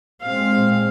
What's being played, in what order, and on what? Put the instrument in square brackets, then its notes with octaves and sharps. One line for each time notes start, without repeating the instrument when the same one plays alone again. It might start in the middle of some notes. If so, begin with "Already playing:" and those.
[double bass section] A#2 G#3 C4 [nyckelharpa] F5